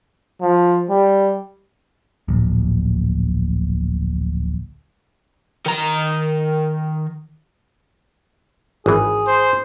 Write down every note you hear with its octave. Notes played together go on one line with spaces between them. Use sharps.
F3
G3
D1 A#1
D#3 A#5
G#1 E3 G#4
C5